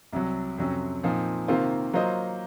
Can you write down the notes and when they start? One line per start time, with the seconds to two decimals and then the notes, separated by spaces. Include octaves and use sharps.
0.12 C2 C3 F#3
0.58 F2 C3 F#3 C#4
1.03 A#2 F3 C4 D#4
1.48 C3 D#3 A#3 F4 C5
1.93 F#3 A#3 F4 C5 D#5